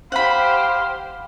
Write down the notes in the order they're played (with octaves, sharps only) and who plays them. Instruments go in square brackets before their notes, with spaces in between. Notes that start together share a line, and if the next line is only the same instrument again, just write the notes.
[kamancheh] G4 C5 [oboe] F5 [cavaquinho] F#5 B5